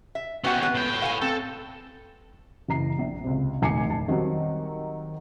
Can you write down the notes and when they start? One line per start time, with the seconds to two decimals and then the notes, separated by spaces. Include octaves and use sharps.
0.15 E5
0.44 B3 C#4 F#4 G4 F#5
0.62 B3 B4
0.75 A2 G5
1.02 F5 F#5 G#5
1.22 C4 A4
2.68 F#1 E3 A#5 C7
2.99 A#1
3.24 C#2 C3
3.62 F1 D#2 G#5 D6 C7 C#7
3.90 A5
4.08 D#3 F#3 G3 C4